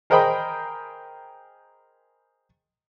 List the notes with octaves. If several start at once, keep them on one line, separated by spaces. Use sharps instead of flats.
G#4 A#4 C5 D#5 G5 B5